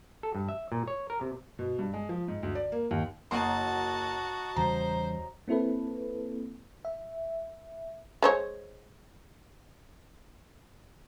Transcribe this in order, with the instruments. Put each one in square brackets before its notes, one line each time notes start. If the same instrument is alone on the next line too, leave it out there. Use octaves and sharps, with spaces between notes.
[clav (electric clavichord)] A4
G2
E5
A#2
C#5
A#4
C3
[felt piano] B2
G2
G#3
F3
G#2
D2
D5
A#3
D#2
[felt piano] F#1 A#3 C6 [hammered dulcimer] F#3 D#4 [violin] F#4 A5
[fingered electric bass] E2 C#3 G3 [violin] C5 [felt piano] A#5
[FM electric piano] A#3 C4 E4 A4 B4
E5
[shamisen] G#3 C5 C#5